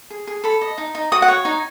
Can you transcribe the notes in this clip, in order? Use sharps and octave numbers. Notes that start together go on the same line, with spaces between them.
G#4
G#4
A4 B5
D#5
D#4
D#4
F#4 D#6
F#5
C#5
D#4